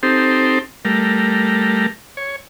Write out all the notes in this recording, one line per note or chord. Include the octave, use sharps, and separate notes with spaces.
C4 D#4 G4 A4 C5
G3 A3 A#4
C#5